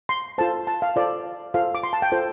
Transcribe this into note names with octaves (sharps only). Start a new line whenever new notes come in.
C6
F4 A4 C5 A5
A5
F5
F4 A4 C5 D5
F4 A4 C5 F5
D6
C6
A5
G5
F4 A4 C5